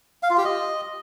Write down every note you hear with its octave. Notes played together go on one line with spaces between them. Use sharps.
F5
F4
G4
D#5